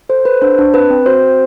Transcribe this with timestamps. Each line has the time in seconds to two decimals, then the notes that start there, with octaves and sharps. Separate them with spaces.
0.09 A4 C5
0.25 A4 B4
0.42 D4 C5
0.59 D4
0.74 C4 B4
0.90 C4
1.06 F#4 C5
1.23 C4